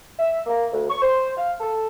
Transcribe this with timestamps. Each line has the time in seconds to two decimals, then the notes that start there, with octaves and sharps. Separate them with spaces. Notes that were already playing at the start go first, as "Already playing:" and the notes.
0.18 E5
0.46 A#3
0.71 D2
0.89 C#6
1.01 C5
1.37 F5
1.60 A4